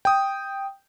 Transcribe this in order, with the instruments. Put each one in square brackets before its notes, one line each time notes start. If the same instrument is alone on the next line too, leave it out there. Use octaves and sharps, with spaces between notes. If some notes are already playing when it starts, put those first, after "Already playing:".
[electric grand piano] G5 D#6